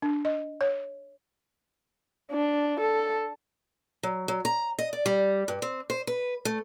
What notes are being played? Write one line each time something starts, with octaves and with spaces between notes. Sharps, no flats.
D4
D#5
C#5
D4
A4
F#3
F#3
A#5
D#5
D5
G3
G2
C4
C5
B4
A3